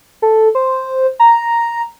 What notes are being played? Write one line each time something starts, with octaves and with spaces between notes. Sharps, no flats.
A4
C5
A#5